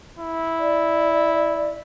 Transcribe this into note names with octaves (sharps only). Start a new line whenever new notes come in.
E4
D5